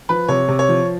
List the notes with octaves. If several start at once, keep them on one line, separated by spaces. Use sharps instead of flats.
F3 B4
C3 C#5
C3
C#5
F3